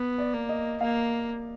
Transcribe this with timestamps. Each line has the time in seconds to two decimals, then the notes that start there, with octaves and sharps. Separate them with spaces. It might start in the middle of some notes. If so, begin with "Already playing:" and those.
Already playing: B3
0.18 D5
0.33 A#3
0.49 D#5
0.81 A#3 F5